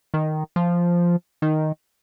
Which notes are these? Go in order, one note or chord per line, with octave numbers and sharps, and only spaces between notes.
D#3
F3
D#3